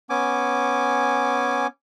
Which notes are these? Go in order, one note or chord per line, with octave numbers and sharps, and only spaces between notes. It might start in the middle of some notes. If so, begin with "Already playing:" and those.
B3 C#4 G#5 D6